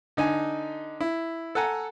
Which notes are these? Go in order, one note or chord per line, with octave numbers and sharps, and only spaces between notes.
D3 D#4 G#5
E4
A4 F#5 G#5 A#5